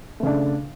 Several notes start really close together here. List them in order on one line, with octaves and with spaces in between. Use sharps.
A3 C#3 D4